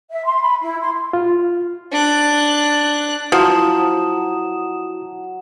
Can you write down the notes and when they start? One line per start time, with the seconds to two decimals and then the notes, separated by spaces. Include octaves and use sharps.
0.10 E5
0.24 C6
0.41 B5
0.62 E4
0.81 C6
1.13 F4
1.91 D4 F#6
3.32 F3 F#3 E4 F#4 D#6 E7